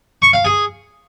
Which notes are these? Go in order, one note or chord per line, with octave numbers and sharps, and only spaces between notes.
C#6
F5
G#4